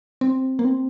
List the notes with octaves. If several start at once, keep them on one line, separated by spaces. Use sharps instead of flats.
C4
A#3
C4